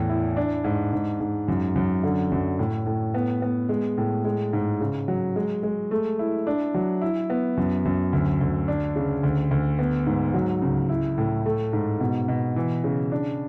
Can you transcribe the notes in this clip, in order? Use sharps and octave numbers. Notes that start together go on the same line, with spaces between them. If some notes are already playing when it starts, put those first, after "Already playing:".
Already playing: E2 A2
E4
D4
G#2
G#2
G#2
F#2
F#2
D3
F#2
A2
A2
B3
B3
G#3
A2
G#3
G#2
C#3
F#3
G#3
G#3
A3
E4
D4
F#3
E4
B3
F#2
F#2
D2
D2
D4
C#3
D2
D2
B3
G#2
F#3
C#2
E4
A2
A3
G#2
B2
B2
E3
C#3
D4